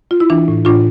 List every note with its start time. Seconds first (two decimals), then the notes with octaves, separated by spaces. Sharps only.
0.11 F4
0.20 E4
0.30 E3 D4
0.48 A2
0.65 A2 D4 F4